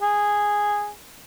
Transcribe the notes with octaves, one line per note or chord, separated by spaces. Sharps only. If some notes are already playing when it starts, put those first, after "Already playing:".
G#4